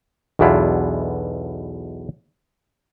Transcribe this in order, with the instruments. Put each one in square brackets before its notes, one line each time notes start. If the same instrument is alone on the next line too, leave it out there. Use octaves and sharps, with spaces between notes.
[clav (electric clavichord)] B1 E2 B2 D4 E4 F4